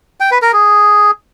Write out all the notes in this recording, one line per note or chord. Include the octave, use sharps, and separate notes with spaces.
G5
B4
A#4
G#4